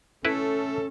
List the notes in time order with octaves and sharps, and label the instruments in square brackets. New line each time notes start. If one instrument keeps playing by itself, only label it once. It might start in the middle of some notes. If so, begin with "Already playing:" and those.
[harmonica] A3 [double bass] C#4 [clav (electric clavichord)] E4 B4 [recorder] A4